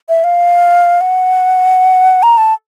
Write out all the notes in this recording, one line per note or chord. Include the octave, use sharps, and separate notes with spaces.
E5
F5
F#5
A#5
A5